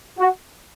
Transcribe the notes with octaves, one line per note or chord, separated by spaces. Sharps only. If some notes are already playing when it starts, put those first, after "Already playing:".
F#4